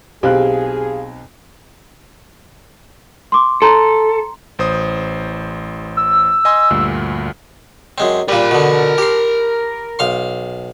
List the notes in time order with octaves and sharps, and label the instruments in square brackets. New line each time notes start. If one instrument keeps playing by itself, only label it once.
[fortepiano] B1 C4 F#6 [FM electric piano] G4 F5 [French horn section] G#4
[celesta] C6 D6
[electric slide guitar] A4 [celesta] A#5 C6
[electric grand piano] A1 C5 D#6
[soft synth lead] E6
[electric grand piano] D#5 G#5 C6
D2 G2 A#2
[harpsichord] F#2 G#3 C4
[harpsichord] A#2 G3 [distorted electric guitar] A#4 B5
[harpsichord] B2 D3
G4 C6
B1 F5 C6